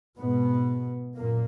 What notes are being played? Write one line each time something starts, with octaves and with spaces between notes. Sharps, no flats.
G#2 B2 B3
F#2 A#2 A#3